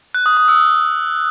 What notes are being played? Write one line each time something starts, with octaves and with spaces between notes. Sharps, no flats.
F#6
D#6
D#6
E6